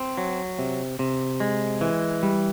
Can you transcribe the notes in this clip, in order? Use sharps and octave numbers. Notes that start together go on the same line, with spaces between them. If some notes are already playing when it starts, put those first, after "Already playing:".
Already playing: C4
F#3
C3
C3
G#3
E3
G3